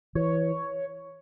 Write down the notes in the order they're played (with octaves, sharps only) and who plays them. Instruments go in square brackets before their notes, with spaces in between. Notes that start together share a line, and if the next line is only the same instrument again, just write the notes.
[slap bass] E3 [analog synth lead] C#5